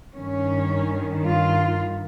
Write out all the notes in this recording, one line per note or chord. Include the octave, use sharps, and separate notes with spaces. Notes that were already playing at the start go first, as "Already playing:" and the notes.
G2 D#3 C#4
F4